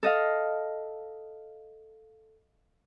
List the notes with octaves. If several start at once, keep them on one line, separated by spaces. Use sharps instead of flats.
A4 D#5 F5